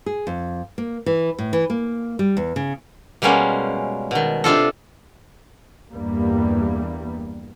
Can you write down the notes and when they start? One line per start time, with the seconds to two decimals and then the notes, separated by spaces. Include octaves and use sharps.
0.06 G#4
0.27 F2
0.78 A#3
1.06 E3
1.39 A2
1.53 E3
1.70 A#3
2.19 G3
2.37 E2
2.56 C#3
3.22 B2 G3 G#3 A#3 C#4
4.11 B2 D#3
4.44 C3 D4 F4 A4
5.91 E2 G2 G3 A#3